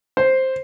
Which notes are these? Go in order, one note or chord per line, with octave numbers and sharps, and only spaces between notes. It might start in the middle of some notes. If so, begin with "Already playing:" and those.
C5